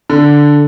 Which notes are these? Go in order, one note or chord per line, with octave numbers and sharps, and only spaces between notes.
D3